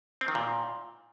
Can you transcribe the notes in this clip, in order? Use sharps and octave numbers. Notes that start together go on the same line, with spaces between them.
C4
D#3
A#2